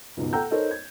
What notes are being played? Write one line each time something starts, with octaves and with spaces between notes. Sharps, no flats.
C#2 G#2 B2
A4 F#5 G5 A#5 E6 G6
D#4 A4 A#4 C5 C#5 D#5
G#6